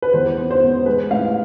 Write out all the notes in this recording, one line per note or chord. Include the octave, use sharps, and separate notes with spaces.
B4
E2 C5
B3
C5
B3
G#3 B4
A2 F5